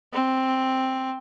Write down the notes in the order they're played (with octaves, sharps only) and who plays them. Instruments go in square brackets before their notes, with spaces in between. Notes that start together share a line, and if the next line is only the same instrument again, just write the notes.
[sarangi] C4